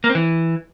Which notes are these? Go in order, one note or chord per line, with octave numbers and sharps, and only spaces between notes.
A#3
C4
E3